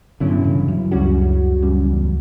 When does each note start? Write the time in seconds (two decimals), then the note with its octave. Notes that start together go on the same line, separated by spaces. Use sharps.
0.20 G2 B2 D3 F#3 C#4 E4
0.44 C#3 E3
0.68 F#2
0.91 C#2 C#3 G3 C#4 F#4
1.63 C#2 F#2 C#3 G3
1.86 E2